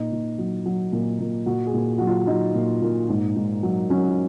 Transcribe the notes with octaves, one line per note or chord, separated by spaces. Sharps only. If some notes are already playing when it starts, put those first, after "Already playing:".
Already playing: A#2 D#4
A#2
F#3
F#3
A#2
A#2
A#2 F#4
G#4
A#2
F#3 F#4
F4
F#3 D#4
A#2
A#2
G#2
G#2
F#3
F#3 C#4